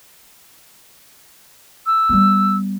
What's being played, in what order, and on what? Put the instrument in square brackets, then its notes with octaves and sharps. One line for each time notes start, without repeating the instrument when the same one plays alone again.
[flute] E6
[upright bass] G3 B3